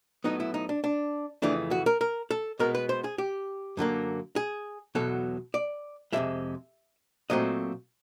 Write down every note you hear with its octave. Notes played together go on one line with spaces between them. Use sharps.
A2 F#3 B3 D#4
E4
D#4
D4
D4
F2 C#3 E3 A3 D4
F#4
A#4
A#4
A4
B2 G#3 B3 A#4
B4
C5
G#4
G4
F#2 D3 F#3 A#3
G#4
E2 B2 F#3 A4
D5
F2 C3 F3 G#3 E5
A#2 F#3 A3 C4 D#5